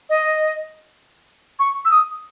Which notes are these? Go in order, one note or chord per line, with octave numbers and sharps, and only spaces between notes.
D#5
C#6
E6
D#6